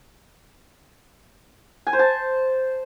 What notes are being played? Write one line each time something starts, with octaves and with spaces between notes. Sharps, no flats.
G#5
C5
A5